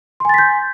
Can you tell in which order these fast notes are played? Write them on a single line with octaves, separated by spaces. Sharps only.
C6 G#5 A6 B6 G6